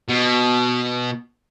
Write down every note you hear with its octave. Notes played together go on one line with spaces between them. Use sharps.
B2